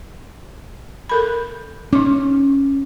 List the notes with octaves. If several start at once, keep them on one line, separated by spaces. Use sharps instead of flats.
A4 A#4 B5
C#4 D#4 D6